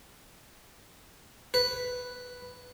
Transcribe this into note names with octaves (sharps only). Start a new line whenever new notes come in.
B4